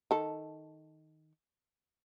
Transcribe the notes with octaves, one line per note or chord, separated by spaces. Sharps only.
D#3 A4